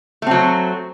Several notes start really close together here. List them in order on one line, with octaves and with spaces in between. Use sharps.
A3 C4 F#3